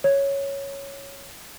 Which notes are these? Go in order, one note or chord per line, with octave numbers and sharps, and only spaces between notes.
C#5